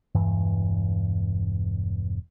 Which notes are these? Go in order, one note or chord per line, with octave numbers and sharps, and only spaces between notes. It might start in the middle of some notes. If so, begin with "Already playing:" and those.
E1 G2 E3